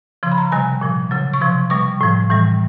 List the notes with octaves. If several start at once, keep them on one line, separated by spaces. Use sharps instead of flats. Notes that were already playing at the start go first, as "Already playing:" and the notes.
C#3 F3 C6
B5
A#5
C3 D#3 G3 G#5
A#2 F3
C#3 F#3
C#6
C3 F3 C6
B2 G3 C#6
A2 F3
A2 E3 G3